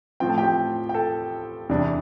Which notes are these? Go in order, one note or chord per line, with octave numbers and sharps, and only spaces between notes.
A2 F3 C4 G5
A5
G4 G5
G5
A4 A5
E2 C3 G3 D4